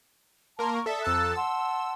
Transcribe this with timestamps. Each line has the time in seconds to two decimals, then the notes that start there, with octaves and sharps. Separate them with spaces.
0.59 A#3 A#4 A5 C6
0.72 C#6
0.86 A4 D5 E5 A5 D#6
1.04 F2 A4 A5 A#5 E6 F#6
1.35 F#5 A5 C6 E6